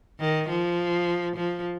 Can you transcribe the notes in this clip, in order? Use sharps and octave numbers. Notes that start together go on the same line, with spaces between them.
D#3
F3
F3